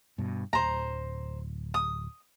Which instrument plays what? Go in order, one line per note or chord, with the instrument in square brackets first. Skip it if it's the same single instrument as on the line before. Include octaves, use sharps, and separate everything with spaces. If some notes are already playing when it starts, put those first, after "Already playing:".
[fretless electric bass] G2 B2
[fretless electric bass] D1 [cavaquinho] C5 A#5
[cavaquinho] D#6